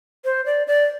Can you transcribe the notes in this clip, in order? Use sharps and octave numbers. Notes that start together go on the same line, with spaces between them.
C5
D5
D5